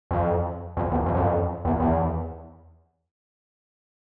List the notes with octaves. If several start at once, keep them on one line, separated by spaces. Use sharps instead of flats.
F2
F2
E2
F2
F#2
F2
E2
E2